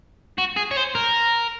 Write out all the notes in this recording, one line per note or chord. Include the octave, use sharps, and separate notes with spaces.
F#4
G#4
C#5
C5
A#4